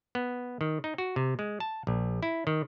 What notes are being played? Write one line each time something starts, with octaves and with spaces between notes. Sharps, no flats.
B3
D#3
D#4
F#4
C3
G#3
A5
A#1
E4
D#3